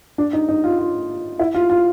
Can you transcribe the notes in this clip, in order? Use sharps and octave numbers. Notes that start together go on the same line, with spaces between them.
D4
D#4
D#4
F4
F4
E4
F4
F4